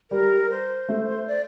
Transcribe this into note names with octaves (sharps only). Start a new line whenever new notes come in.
G3 A#4
C5
A3
D5